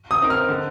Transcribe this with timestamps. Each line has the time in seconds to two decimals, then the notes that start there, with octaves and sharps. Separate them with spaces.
0.11 D#6
0.21 C4 D#4 A#4
0.30 F6
0.49 D3